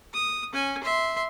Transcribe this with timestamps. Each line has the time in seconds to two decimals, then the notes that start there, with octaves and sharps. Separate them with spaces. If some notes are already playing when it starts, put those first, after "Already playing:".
0.14 D#6
0.53 C#4 G#5
0.83 E5 C6